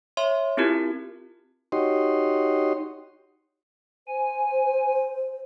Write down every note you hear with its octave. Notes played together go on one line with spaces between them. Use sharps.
C#5 E5 C6
C4 E4 F4 G4 A#4
D#4 F#4 G4 C#5 D#5 C6
C5 G#5